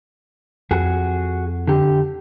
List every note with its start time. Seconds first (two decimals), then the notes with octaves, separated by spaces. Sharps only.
0.71 F2 F#4 G#4
1.67 D3 G4